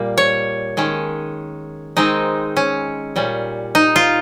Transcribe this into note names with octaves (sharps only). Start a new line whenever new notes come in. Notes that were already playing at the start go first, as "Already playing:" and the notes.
Already playing: A#2 G3 A#3
C#5
D#3 G#3 C#4
D#3 G#3 C4 D#4
C#4
A#2 G3 C#4
D#4
F4